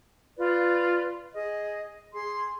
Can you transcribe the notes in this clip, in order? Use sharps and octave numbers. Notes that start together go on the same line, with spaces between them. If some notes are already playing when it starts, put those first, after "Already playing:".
F4 B4 D5
G#4 D#5
G#4 C6